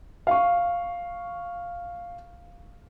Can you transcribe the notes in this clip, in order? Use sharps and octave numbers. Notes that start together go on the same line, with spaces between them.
F5 C#6